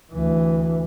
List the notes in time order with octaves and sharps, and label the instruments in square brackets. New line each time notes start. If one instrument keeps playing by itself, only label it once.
[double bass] D2 E3